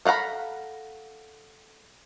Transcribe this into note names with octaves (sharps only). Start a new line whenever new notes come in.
A4 F5 F#5 A#5 B5